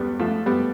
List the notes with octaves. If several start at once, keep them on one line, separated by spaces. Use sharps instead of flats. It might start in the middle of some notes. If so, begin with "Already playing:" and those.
Already playing: E2 G3 B3
F3 A3
G3 B3